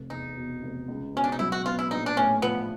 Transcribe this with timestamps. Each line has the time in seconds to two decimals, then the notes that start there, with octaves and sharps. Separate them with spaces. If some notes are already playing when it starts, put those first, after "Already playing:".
Already playing: F1
0.10 E2 D#4
0.37 B2
0.63 F1
0.88 C#2
1.14 B2 C#4
1.24 D4
1.32 D#4
1.39 F#3 E4
1.52 F#4
1.65 B3 F4
1.79 E4
1.91 A#1 D#4
2.06 D4
2.17 A2 C#4
2.42 F3 B3